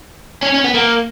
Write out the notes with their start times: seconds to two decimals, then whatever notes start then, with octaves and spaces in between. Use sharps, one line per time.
0.43 C#4
0.54 C#4
0.65 B3
0.74 A#3